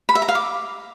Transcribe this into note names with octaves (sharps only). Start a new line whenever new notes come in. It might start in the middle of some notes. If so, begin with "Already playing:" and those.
B5
E5
A#5
F5
D6